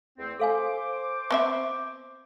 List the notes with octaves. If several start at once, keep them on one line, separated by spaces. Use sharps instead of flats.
E2 A3 C4
A4 C5 F5 G#5 D6
B3 C4 E5 C#6